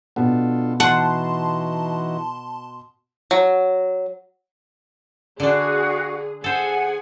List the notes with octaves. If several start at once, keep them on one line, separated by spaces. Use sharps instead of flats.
B2 B3 D4 F4 A4
E3 D#4 F#4 F#5 A5 C6
F#3
D3 D4 F#4 G#4 F5
G#4 A4 C5 F#5 G#5